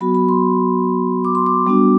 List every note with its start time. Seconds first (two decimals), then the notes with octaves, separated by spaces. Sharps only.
0.01 F#3 B3 F#4 B5
0.15 B5
0.29 C6
1.25 D6
1.35 C6
1.46 D6
1.67 G3 B3 D4 F#4